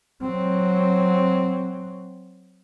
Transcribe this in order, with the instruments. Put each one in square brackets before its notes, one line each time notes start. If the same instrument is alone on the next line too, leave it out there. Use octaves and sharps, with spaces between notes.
[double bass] F#3 C4